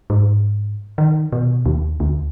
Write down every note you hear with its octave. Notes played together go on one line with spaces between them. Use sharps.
G#2
D#3
B2
D#2
D2